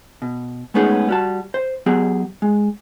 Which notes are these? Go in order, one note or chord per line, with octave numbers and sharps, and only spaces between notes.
B2
G#3 A3 B3 C#4 D#4 G#4
G3 F#4 A5
C5
F#3 B3 G4 G#4
G#3